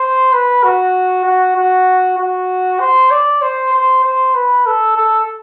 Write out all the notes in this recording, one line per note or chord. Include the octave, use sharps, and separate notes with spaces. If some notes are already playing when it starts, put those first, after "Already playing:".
Already playing: C5
B4
F#4
F#4
F#4
F#4
C5
D5
C5
C5
C5
B4
A4
A4